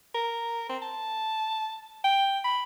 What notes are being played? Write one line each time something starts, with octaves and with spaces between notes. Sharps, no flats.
A#4
C4
A5
G5
B5